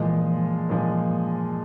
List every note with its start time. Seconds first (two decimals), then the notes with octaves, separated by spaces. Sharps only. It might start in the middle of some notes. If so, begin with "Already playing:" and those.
Already playing: A#2 E3 F3 G#3
0.69 A#2 F3 G#3